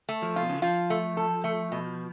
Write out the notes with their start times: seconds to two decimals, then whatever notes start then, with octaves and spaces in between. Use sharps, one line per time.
0.09 A3
0.22 F3
0.36 F4
0.41 B2
0.49 C#3
0.56 D3
0.62 F3 F4
0.90 A3
1.17 A4
1.44 A3
1.72 B2